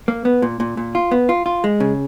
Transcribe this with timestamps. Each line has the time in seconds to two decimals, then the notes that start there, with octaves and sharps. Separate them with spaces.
0.08 A#3
0.25 B3
0.42 A#2
0.60 A#2
0.77 A#2
0.95 F4
1.11 B3
1.29 F4
1.46 F4
1.64 G#3
1.80 C#3